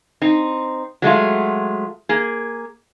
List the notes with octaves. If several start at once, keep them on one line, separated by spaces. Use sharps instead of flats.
C4 D#4
F#3 G#3 A3 F4
A#3 G#4